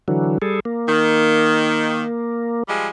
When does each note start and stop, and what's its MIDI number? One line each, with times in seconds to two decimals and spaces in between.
0.08 0.38 50
0.08 0.38 52
0.08 0.38 54
0.42 0.60 55
0.42 0.60 68
0.42 0.60 69
0.65 2.63 58
0.88 2.03 51
2.68 2.88 53
2.68 2.88 55
2.68 2.88 56